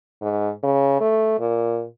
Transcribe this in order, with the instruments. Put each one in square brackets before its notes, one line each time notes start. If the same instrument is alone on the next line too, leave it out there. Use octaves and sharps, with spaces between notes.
[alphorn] G#2
C#3
A3
A#2